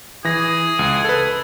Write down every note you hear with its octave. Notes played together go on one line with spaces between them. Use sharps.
E3 G#4 A#6
C#2
A4 B4